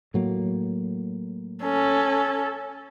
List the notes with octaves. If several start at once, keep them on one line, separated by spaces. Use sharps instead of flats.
A2 F#3 A#3
C#4 A4